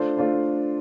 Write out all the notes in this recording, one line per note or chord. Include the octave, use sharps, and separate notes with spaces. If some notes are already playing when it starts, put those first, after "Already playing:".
Already playing: A3 D4 F4 C5
A3 D4 F4 C5